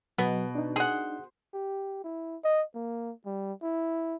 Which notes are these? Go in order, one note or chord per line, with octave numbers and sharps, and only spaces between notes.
B2 F#3 B3
D4 D#4
G#4 C5 F#5
G4
E4
D#5
A#3
G3
E4